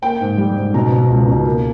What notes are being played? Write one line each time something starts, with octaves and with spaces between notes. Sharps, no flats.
A#3 G5
G#2
G3
G#2
B2 A#5
B2
C#2
B2
A#3